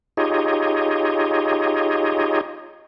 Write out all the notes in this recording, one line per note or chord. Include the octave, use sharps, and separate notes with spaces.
D#4 F4 G4 G#4 C#5 D#5